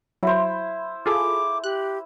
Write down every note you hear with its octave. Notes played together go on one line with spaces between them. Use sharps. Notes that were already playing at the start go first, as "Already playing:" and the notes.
F#3 E4 C5
F4 G#4 A4 D6
G4 F#6